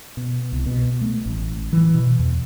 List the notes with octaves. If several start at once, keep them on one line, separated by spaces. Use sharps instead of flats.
B2
C2
B2
A3
A1
E3
B2
E2